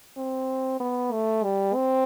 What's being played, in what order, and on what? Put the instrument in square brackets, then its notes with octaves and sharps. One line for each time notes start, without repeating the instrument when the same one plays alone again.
[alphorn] C4
B3
A3
G3
C4